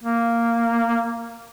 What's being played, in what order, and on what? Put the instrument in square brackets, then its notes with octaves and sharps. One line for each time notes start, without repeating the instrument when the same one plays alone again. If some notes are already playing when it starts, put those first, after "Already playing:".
[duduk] A#3